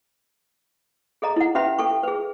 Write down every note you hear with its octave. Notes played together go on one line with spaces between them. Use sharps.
G#4 A4 D#5 A#5
E4 F#5
C#4 G4 B4 E5 B5
A4 G5 C#6
G#4 B4